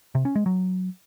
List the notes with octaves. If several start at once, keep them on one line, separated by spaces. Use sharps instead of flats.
C3
C#4
G#3
F#3